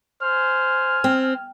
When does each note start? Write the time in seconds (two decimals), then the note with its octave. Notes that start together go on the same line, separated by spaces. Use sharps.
0.22 C5 G#5 F6
1.04 C4